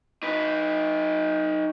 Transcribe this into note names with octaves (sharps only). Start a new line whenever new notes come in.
D#4 B4